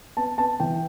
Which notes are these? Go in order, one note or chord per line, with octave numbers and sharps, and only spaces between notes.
B3 A5
B3 A5
E3 G5